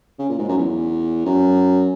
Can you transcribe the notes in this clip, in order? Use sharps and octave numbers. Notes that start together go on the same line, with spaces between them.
C#3
A#2
G#2
F#2
E2
F#2